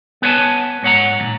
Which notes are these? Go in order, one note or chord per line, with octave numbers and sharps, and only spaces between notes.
B3 B4 C#5 F5 G#5 A5
G#2 C#5 F#5 A#5
E2 A#2